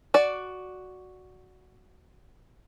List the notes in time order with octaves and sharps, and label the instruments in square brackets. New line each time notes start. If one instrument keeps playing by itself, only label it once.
[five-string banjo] F#4 D5